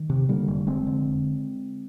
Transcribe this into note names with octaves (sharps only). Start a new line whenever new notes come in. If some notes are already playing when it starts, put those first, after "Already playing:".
Already playing: D#3
C3
D3 G3 A#3
F1
F1 G#3 C4
D3